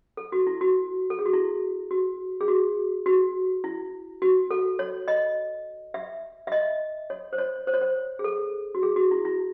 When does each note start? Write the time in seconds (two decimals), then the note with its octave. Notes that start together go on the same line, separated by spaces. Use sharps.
0.17 A4
0.32 F#4
0.47 E4
0.61 F#4
1.10 A4
1.19 G#4
1.26 F#4
1.33 E4
1.91 F#4
2.41 G#4
2.48 F#4
3.06 F#4
3.64 E4
4.22 F#4
4.51 A4
4.79 C#5
5.08 D#5
5.94 E5
6.47 E5
6.52 D#5
7.10 C#5
7.33 C5
7.38 C#5
7.67 C5
7.74 C#5
7.81 C5
8.19 G#4
8.24 A4
8.75 F#4
8.83 G#4
8.96 F#4
9.11 E4
9.25 E4